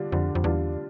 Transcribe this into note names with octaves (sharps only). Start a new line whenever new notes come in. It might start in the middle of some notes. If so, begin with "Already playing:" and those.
Already playing: D3 G3 D4 F4
F2 D3
F2
E2 G3 D4 F4